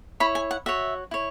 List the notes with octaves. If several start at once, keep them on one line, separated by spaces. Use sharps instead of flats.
E4 C#5 B5
G#5
F#5
F#4 C#5 E5
E4 C#5